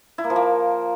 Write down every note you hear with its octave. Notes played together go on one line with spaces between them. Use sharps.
E4
A#3
F3
A#3